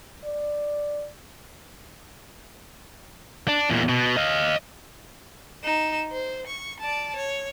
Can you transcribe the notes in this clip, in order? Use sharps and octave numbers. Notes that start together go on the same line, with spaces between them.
D5
D4
E2 A#2
B2
D#5 F5
D#4 E7
C5
C#6
D5 A5
C#5